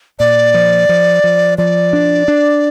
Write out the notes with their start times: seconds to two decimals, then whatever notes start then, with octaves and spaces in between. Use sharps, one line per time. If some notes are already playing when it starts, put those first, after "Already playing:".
0.19 A#2 D5
0.54 F3
0.89 F3
1.24 F3
1.58 F3 D5
1.93 D4
2.28 D4